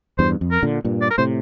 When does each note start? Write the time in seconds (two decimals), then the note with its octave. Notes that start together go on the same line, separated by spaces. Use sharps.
0.18 E2 G2 C5
0.41 F2
0.51 A#4
0.63 A#2 D3
0.85 G2 A#2
1.01 D5
1.10 A#4
1.18 A2 C3 C5